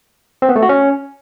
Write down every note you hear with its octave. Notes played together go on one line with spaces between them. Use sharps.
C4
B3
A3
F#4
C#4